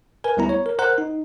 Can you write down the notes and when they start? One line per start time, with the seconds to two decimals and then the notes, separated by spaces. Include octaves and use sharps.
0.24 A#4 B4 G#5
0.37 D2 G3 B3 E4 A#5
0.49 C#5
0.66 A#4
0.79 A#4 C5 F#5 A#5 F#6
0.98 D#4